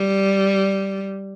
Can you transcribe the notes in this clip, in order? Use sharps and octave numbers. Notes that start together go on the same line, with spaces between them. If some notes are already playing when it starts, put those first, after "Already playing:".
Already playing: G3